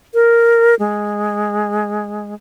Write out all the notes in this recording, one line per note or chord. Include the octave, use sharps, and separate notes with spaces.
A#4
G#3